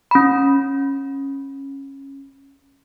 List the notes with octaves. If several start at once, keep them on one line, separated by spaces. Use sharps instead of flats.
C#4 B5